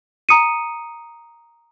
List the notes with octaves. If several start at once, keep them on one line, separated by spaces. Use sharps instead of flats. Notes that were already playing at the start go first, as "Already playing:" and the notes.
A#5 D#6 C#7 D#7